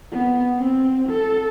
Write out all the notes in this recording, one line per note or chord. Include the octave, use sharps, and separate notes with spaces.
B3
C4
A4